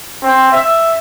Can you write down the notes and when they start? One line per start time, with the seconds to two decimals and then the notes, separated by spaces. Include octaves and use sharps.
0.23 C4
0.52 E5